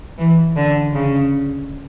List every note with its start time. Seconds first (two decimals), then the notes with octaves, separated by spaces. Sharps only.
0.18 E3
0.56 D3
0.94 C#3